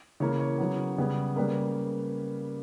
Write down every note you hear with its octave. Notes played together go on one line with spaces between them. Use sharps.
C#3 E3 A#3 C#5
C#5
C#3 F#3 B3
C#3 G3 B3
C#3 G3 A#3 B4